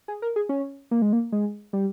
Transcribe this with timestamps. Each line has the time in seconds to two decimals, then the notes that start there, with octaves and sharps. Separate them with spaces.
0.08 G#4
0.22 A#4
0.36 G#4
0.49 C#4
0.91 A#3
1.02 G#3
1.13 A#3
1.32 G#3
1.73 G3